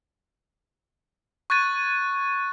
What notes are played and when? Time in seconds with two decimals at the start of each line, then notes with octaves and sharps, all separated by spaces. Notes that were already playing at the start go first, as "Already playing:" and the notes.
1.50 C#6 F#6 G#6 A6 D#7